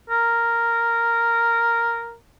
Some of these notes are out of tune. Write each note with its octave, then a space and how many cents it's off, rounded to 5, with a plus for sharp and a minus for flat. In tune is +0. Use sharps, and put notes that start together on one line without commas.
A#4 -5